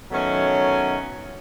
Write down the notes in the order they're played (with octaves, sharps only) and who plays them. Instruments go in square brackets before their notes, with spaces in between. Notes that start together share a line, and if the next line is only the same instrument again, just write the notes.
[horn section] B2 D#3 F#3 A3 C#4